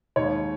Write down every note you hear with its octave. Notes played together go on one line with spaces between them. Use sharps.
D#2 D#3 G#3 C#5